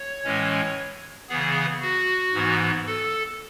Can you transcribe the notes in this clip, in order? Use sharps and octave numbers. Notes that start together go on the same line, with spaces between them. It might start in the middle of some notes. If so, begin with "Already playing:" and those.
Already playing: C#5
A2 E3 G#3 C#4
C#3 E3 B3 G#4
F#4
G#2 E3 B3
A4